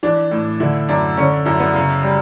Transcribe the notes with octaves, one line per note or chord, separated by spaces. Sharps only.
E3 D4
A2
D3 E4
F#2 D4
D3 C#4
F#2 E4
B3
C#3
G3